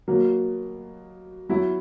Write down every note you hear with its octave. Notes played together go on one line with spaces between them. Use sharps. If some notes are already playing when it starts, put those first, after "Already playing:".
B2 F#3 A#3
F#3 B3 E4